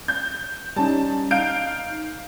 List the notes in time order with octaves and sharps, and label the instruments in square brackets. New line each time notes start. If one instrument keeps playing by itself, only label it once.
[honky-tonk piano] G6
[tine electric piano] G3 C#4 D#4 [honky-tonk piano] A5
[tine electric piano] D#4 [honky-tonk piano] F5 G6 D7